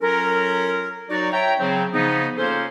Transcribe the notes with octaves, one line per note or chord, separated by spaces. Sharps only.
F#3 C#4 F4 A4 A#4
F#3 D#4 F#4 D5
C#5 E5 G5 A#5
C#3 F#3 C4
C#3 F3 B3 D#4
A#3 C#4 F4 A4 C5